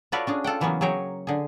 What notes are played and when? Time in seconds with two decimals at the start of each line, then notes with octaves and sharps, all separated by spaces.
0.12 F4 F#4 A4 B4 C#5 D5
0.27 C#4 D4 G#4
0.44 F4 A4 F#5 G5
0.61 C#3 E3 F#3 A#3 B3 C#4
0.81 F#3 G#4 C#5 G5 A#5
1.27 D3 G#4